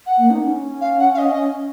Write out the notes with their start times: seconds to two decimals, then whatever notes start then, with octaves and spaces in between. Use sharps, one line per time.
0.06 F#5
0.18 A#3
0.30 D#4
0.43 C#4
0.80 F5
0.99 F#5
1.13 F5
1.18 D#5